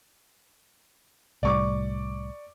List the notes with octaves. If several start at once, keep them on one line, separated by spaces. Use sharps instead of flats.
C2 A2 G3 D5 C#6 D6